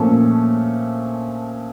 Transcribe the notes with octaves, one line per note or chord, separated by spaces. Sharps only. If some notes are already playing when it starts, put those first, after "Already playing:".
Already playing: A#2 F3 A3 C#4 A4